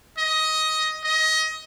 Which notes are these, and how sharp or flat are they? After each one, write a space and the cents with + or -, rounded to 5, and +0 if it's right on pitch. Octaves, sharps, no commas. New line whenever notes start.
D#5 +15
D#5 +25